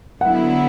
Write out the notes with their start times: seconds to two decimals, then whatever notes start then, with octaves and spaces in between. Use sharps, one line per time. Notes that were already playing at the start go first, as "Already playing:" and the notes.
0.21 D3 F#3 B3 E4 F#5